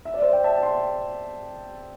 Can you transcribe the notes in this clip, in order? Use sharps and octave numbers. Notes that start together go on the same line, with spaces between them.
E5
D5
C5 E5
G5
E5 A5
A5
G5 C6